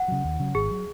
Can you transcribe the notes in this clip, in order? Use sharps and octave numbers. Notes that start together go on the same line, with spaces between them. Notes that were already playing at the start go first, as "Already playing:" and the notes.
Already playing: F#5
C#3 F#3
D#2
C#3 F#3
G#1 G#4
F#3